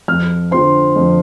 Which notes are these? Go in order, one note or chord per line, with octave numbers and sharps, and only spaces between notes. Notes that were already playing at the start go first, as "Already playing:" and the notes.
F2 F6
D3 F3 C4 C6
F2